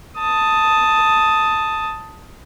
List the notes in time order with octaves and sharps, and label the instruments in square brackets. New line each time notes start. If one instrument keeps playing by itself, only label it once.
[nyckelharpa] A5 D#6